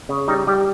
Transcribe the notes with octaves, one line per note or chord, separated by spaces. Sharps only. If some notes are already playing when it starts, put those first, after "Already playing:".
C#3
G3 D#4
G3 G4